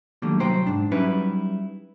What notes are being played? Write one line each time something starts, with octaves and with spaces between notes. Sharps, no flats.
D3 D#3 F#3 G3 A3 A#3
C2 F#3 C5 G5 A#5 C6
G#2 D4
F#3 G3 C#4 D#4 E4 B4